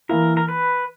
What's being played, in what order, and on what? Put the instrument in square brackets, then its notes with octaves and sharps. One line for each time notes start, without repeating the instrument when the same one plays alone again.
[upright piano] E3 A#3 E4 [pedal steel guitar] A#4
[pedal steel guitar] A#4
B4